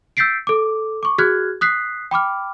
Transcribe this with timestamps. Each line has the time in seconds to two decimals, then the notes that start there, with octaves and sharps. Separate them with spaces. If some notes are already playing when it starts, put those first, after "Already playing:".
0.17 E6 G6 A6 B6 C7 D7
0.47 A4 D6
1.03 C#6 D6
1.18 F#4 G#4 F6 F#6 G#6
1.61 D#6 F#6 B6 C7
2.11 G5 B5 D6 F6